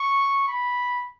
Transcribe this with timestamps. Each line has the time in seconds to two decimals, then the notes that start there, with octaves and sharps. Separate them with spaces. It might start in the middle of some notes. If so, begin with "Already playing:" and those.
Already playing: C#6
0.48 B5